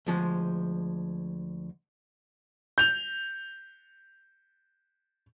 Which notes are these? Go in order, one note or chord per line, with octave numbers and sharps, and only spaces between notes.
D2 F3 G#3
G6 F7